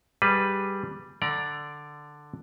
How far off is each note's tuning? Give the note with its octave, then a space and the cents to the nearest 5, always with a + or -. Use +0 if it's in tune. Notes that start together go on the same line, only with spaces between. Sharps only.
G3 +0 G#4 +0 B4 +0
D3 +5 D5 +0 A#5 +35